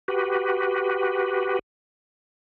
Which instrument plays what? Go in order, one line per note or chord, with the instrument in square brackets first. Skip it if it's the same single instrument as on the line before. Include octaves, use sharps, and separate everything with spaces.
[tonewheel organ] F#4 G4 B4